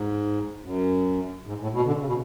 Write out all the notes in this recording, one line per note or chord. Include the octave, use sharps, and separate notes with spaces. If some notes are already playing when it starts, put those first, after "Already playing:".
Already playing: G#2
F#2
G#2
A2
B2
D3
C#3
B2